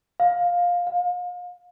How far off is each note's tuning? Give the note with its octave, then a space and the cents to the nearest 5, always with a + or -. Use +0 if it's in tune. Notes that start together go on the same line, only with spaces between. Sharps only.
F5 +10
F5 +35